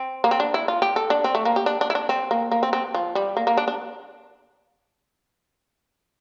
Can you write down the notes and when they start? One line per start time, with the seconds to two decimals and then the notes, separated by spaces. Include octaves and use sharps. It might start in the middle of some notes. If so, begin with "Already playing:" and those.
Already playing: C4
0.24 A#3
0.31 C4
0.40 D4
0.54 E4
0.68 F4
0.82 G4
0.96 A4
1.10 D4
1.24 C4
1.35 A3
1.45 A#3
1.56 G4
1.66 D4
1.81 D4
1.90 E4
1.95 D4
2.09 C4
2.31 A#3
2.51 A#3
2.63 C4
2.73 C4
2.94 F3
3.15 G3
3.37 A#3
3.47 A#3
3.57 D4
3.68 D4